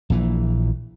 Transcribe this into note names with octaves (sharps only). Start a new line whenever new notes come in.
A#1 A#2 E3